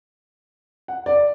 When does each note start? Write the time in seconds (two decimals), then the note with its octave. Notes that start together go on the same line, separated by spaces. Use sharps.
0.88 F#5
1.06 D5